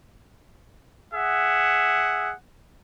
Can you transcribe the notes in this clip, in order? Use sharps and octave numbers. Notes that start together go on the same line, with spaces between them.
G#4 E5 F#5